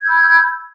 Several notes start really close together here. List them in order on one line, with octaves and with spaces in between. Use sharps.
G#6 G6 E6 B5